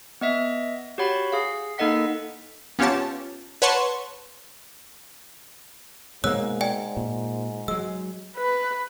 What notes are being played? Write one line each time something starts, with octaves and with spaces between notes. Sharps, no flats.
B3 D#5 E5
F#4 G4 C#5 F#5 B5
G#4 F5
A#3 D#4 A4 D#5 F#5 B6
B3 C#4 F4 G4 C#5 A5
B4 C#5 F#5 A5 C6 C#6
G#2 B2 G#3 A#3 C#5 E6 F#6
D5 G5 G#5
A#2
F#3 G#3 E6
B4